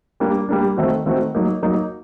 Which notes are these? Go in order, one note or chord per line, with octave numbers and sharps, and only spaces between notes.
G3 A#3 D4
G3 A#3 D4
D#3 A3 C4 F#4
D#3 A3 C4 F#4
F#3 A#3 D#4
F#3 A#3 D#4